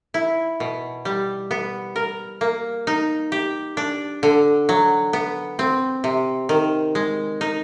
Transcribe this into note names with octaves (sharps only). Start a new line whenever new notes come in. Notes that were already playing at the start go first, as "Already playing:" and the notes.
E4
B2
G3
B3
A#4
A#3
D#4
G4
D4
D3
F#3
B3
C4
C3
D#3
G#3
D#4